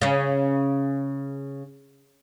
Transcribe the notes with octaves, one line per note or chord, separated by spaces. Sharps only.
C#3 C#4